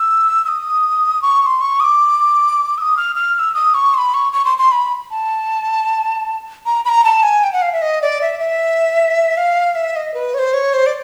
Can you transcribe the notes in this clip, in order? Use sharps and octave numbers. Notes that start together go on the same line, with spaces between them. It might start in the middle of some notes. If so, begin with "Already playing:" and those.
Already playing: E6
E6
D#6
C#6
C#6
C6
C#6
D#6
D6
E6
D#6
F6
F6
F6
E6
D#6
C#6
C6
B5
C#6
C#6
C6
C6
B5
A5
A#5
B5
A#5
A5
G#5
G5
F#5
F5
E5
D#5
D5
E5
E5
F5
E5
D#5
B4
C#5
C5
C#5
C5
D5